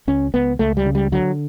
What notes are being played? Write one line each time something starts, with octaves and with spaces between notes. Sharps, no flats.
C#2 C#4
C#2 B3
C#2 A3
G3
C#3
G3
D3 F#3